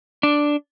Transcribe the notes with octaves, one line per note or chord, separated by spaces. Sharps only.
D4